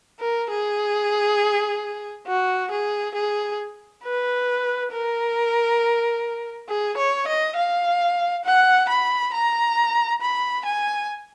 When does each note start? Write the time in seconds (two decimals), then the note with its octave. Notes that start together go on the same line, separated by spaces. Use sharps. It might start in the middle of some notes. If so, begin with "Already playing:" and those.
0.20 A#4
0.50 G#4
2.27 F#4
2.71 G#4
3.15 G#4
4.04 B4
4.92 A#4
6.69 G#4
6.97 C#5
7.28 D#5
7.56 F5
8.45 F#5
8.89 B5
9.34 A#5
10.22 B5
10.65 G#5